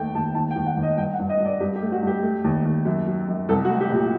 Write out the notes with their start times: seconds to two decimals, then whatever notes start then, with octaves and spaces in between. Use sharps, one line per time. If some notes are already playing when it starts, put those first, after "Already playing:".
Already playing: D#2 A3 G5
0.15 D#2 A5
0.35 D#2 A5
0.51 G5
0.56 D#2
0.66 F#5
0.77 D#2
0.83 D#5
0.97 G2 G5
1.14 F#5
1.19 G2
1.29 D#5
1.40 G2
1.45 D5
1.60 G2 G4
1.76 G4
1.82 A3
1.92 F#4
2.02 G2 G4
2.23 A3
2.44 D#2
2.65 D#2
2.85 F#2
3.07 F#3
3.28 F#2
3.48 C2 A4
3.65 F#4
3.70 A3
3.80 G4
3.90 A#2
3.96 G4